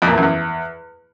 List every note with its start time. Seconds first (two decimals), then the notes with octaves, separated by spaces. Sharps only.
0.02 F2
0.07 A#2
0.12 E2
0.17 F#2
0.23 E2